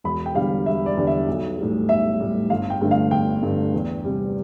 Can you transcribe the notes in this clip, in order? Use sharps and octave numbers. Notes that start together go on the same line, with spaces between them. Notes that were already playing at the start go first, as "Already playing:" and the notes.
E1 B5
G5
E2 D3 G3 F5
E1 E5
D5
E2 D3 G3
E5
B1
A2 G3
B1 E5
A2 G3
G1 F5
G5
G2 D3 A3
F5
G1 G5
G2 D3 A3
E2
C3 G3